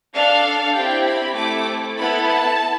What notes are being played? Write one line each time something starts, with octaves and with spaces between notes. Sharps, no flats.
D4 A4 F5
C4 E4 G4 G5
B5
A3 C4 E4 A4 D6
B3 E4 A4 B5
A5